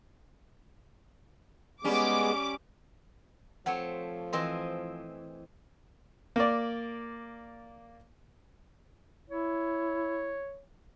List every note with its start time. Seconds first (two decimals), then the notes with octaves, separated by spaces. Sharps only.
1.84 G3 G#3 B3 C#4 G#4 D6
3.66 F3 A3 C4 C#5 F#5
4.33 E3 C4 D#5 C6
6.36 A#3 D5
9.30 E4 C#5